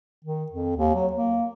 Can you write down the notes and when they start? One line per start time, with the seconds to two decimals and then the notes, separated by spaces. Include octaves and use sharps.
0.25 D#3
0.52 F2
0.77 D#2
0.95 F#3
1.13 A#3